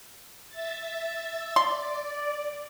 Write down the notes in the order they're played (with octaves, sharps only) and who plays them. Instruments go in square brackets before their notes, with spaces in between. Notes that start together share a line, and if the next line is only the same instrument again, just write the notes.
[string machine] E5 A6
[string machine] D5 [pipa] C6